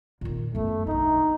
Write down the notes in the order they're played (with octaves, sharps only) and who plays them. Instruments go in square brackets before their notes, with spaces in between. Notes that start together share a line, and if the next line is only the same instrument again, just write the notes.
[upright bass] A#2 D#3
[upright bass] F#2 B3 [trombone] A3
[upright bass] B1 D4 [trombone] D#4